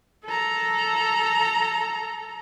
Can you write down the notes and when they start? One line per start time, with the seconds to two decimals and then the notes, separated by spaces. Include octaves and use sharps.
0.24 A4 A#5